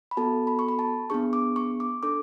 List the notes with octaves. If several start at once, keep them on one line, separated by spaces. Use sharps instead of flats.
B5
B3 F#4 A4 A5
B5
C#6
B5
A5
B3 D4 G#4 C#6
D6
C#6
D6
D4 A4 D6